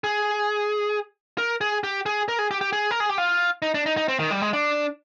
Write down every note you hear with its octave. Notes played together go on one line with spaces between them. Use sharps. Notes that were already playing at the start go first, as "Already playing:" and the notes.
G#4
A#4
G#4
G4
G#4
A#4
G#4
G4
G4
G#4
A#4
G#4
G4
F4
D#4
D4
D#4
D#4
C4
D#3
G3
G#3
D4